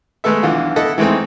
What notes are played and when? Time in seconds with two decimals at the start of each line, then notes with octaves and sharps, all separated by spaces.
0.24 G#3 A3 B3 A4 E5
0.43 B1 D3 E3 F4
0.76 E4 A4 D#5 F#5
0.98 E3 G#3 A3 C4 D#4